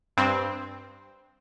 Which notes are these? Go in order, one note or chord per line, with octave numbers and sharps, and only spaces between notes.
G2 C4